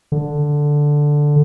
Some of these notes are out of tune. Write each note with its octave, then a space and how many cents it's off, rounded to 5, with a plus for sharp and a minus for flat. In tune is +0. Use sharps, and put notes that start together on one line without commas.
D3 +0